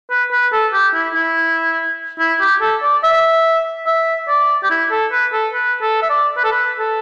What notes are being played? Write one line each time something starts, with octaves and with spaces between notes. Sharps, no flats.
B4
B4
A4
G4
E4
E4
E4
G4
A4
D5
E5
E5
D5
G4
E4
A4
B4
A4
B4
A4
E5
D5
B4
A4
B4
A4